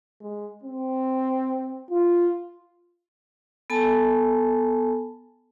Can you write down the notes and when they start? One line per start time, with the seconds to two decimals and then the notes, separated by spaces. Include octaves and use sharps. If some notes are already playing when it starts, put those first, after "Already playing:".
0.21 G#3
0.64 C4
1.90 F4
3.70 B3 A4 G#5 A5